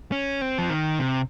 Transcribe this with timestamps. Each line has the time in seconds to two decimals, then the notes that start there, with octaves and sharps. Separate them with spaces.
0.12 C#4
0.41 C4
0.58 F3
0.70 D#3
0.99 C3